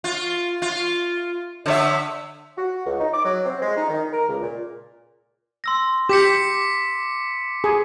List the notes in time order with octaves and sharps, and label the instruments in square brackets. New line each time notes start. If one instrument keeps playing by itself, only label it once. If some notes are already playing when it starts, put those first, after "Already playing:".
[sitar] F4
F4
D3 C#5 E5
[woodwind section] F#4
C#2
D#4
D6
F#3
C4
G#3
D#4
D#3
A#4
C#2
A#2
[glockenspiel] C6 E6 A#6
[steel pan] G4 [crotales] D6 B6 C#7
[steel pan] G#4